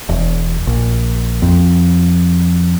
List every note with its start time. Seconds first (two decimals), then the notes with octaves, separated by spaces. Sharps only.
0.09 E1
0.67 A#1
1.42 F2